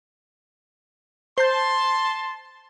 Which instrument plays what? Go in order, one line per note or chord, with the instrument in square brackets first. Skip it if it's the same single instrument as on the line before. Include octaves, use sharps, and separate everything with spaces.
[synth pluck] C5 G6 [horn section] A5 C6